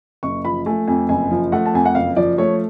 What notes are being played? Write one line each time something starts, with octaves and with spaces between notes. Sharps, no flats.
F#1 C#6
F3 B5
A3 G#5
F2 G#5
F#1 G#5
F3
A3 F#5
A5
F2 G#5
F#5
F#1 F5
F3 D5
A3 C#5